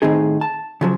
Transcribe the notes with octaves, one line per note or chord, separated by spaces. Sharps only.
A2 D#3 C4 D#4 G#4
A5
C#3 F3 F#3